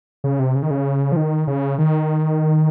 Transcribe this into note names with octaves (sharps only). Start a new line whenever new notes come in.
C#3
C3
C#3
D#3
C#3
F3
D#3
C#3
D#3